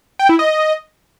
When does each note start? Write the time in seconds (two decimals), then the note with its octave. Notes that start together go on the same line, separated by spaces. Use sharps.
0.19 G5
0.29 E4
0.39 D#5